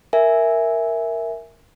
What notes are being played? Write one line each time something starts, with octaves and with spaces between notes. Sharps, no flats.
A#4 E5 G#5